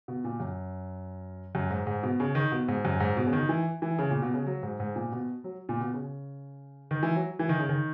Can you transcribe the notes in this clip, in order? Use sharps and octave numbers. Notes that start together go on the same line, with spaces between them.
B2
A#2
F#2
F#2
G#2
G#2
B2
C#3
D#3
B2
G#2
F#2
G#2
B2
C#3
D#3
E3
E3
C#3
A#2
B2
C#3
F#3
G#2
G#2
A#2
B2
F#3
A#2
B2
C#3
D#3
E3
F#3
E3
D#3
C#3
D#3